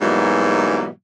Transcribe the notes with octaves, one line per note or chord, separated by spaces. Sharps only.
G#2 B2 E3 F#3 G3 A#3